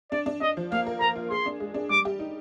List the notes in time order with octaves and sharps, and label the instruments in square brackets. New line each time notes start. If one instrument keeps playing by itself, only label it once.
[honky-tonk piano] D4 [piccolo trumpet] D5
[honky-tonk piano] D4
[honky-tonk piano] D4 [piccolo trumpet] D#5
[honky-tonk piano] F3
[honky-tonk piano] A#3 [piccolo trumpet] F5
[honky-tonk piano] A#4
[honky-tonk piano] A#4 [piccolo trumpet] A#5
[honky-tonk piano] F4
[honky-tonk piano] G#4 [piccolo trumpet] C6
[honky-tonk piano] D4
G#3
D4
[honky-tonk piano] G3 [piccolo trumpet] D6
[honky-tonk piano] G4
D#4